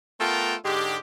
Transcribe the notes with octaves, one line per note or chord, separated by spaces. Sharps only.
A3 B3 F4 A4 A#4 G5
G#2 D3 G#3 G4